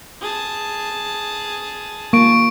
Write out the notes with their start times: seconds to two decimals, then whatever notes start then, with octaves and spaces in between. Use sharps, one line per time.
0.21 G#4 A5
2.13 A#3 C#6 D7